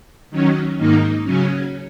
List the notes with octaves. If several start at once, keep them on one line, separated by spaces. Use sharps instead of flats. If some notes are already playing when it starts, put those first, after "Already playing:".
D#3 F#3 C#4
G#2 D#3 A#3 D#4
C#3 F#3 C#4